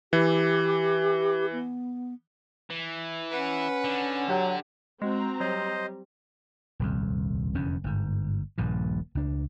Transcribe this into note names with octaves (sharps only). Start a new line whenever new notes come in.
E3 G4
B3
E3
C#4 B4 F#5
D3
F#3 G4 F#5
G#3 C4 F#4 A#5
F#3 G3 C5 D#5
D#1 C2 F2
F1 E2 D3 C#4
G1 G#2
D#1 A#1 G2 A#2
C#2 D4